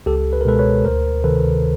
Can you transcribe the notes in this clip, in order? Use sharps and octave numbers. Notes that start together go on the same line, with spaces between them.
C#2 G4 A4
B4
A#4
B2 G#3 A4 B4
B4 C#5
D2 A#4 C5
C3 D#3 A4 B4